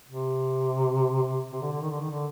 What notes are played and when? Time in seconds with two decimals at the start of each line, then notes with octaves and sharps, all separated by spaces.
0.08 C3
1.23 C3
1.52 C3
1.62 D3
1.72 D3
1.81 D#3
1.91 D3
2.01 D#3
2.10 D3